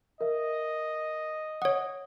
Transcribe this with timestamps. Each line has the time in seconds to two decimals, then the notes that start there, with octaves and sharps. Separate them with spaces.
0.21 A#4 D#5 E5
1.62 C#5 F#5 D#6